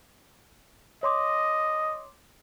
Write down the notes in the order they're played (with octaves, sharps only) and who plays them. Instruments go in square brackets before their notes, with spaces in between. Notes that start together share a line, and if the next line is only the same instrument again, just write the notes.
[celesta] C#5 C6 D6 [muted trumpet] D#5